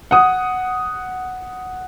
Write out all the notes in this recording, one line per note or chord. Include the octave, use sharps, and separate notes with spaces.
F#5 D#6